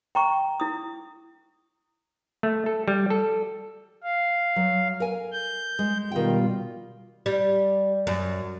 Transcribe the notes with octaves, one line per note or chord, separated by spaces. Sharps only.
G5 A#5 C#6
E4 D#6
A3
A4
G3
A4
F5
F#3
A#4 G#5
G6
G#3
B2 D#3 G3 F4 G5
G3
F#2